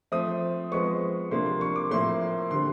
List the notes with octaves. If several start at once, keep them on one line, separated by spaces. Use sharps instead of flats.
F3 A3 C4 D#6
F3 G#3 B3 C#6
C3 F3 A#3 D4 C6
C6
C#6
D6
A2 F3 A#3 C6
D3 G3 C4 C6